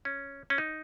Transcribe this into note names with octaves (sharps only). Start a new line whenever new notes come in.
C#4
C#4
D#4